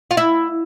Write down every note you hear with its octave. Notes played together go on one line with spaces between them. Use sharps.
F4
E4